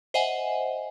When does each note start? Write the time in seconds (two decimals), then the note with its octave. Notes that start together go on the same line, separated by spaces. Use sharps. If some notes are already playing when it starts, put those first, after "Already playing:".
0.14 C5 D#5 E5 F#5 G#5